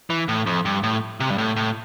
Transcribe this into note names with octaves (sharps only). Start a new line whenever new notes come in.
E3
A2
F2
G2
A2
C3
G2
A2
A2